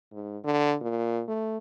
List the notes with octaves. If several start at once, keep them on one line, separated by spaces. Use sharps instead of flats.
G#2
D3
A#2
A3